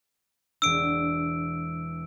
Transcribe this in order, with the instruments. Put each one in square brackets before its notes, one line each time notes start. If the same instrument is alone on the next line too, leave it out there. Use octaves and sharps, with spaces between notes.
[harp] E1 D4 [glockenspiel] E6 D7